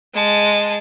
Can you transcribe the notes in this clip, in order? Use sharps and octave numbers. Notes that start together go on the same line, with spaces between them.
G#3 A5